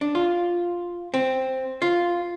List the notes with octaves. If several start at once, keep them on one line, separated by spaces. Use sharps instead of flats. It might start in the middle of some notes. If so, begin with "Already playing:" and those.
D4
F4
C4
F4